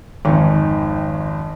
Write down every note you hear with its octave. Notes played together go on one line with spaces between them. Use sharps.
G#1 F2 D#3 C#4